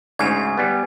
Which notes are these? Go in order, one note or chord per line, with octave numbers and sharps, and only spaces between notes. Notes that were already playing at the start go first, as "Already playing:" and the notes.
D2 G#2 C#3 G#5 G#6
G3 B3